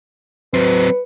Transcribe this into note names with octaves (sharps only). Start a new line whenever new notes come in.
F#3 C4 B4